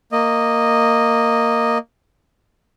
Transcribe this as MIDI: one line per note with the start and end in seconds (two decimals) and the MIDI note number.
0.12 1.78 58
0.12 1.78 75